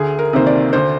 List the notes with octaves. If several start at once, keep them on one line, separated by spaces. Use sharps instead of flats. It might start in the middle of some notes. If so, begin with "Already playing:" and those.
Already playing: D2 G#4
A#4
C3 D#3 A#3 C5
D5
D2 C5